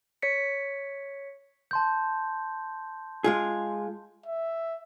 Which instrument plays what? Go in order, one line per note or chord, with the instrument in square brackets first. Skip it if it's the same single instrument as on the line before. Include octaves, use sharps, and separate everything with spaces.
[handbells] C#5 B6 C#7
[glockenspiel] A5 C6 G6
[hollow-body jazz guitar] G#3 F4 G#4
[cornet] E5